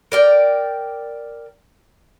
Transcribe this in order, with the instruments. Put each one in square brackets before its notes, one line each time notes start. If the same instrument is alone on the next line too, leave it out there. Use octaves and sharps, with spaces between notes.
[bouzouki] A#4 D5 G5